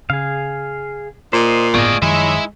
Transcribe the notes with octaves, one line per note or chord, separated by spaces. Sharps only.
C#3 G#4 F5
A#2 C5 D#5
G1 A2 A3 B3 F4 G#4 D5 D#5
F#2 D#3 F3 G#3 D#4 E4 C#5 E5